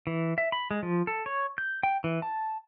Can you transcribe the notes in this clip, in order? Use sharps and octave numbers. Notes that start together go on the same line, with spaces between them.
E3
E5
B5
G#3
F3
A4
C#5
G6
G5
E3
A5